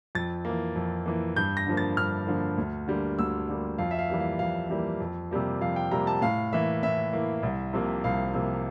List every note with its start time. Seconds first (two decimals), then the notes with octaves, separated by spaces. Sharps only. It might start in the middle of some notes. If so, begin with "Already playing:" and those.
0.15 F2 A6
0.45 E3 A#3
0.76 F2
1.06 E3 A#3
1.36 G2 G6
1.57 A#6
1.66 D3 F3 A#3
1.77 A6
1.97 G2 F6
2.27 D3 F3 A#3
2.58 D2
2.88 D3 G3 A#3
3.19 D2 E6
3.49 D3 G3 A#3
3.78 F2 F5
3.91 E5
3.99 F5
4.10 E3 G3 A#3
4.20 F5
4.39 F2 F5
4.70 E3 G3 A#3
5.00 F2
5.31 C3 G3 A#3
5.61 F2 F5
5.76 G5
5.91 C3 G3 A#3 A#5
6.07 A5
6.22 A2 F5
6.53 E3 A#3 E5
6.83 A2 E5
7.13 E3 A#3
7.43 C2
7.73 C3 F3 A#3
8.04 C2 F5
8.34 C3 F3 A#3